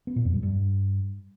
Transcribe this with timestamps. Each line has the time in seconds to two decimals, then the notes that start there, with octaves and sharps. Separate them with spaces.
0.07 B3
0.16 A#2
0.25 F2
0.34 G3
0.43 G2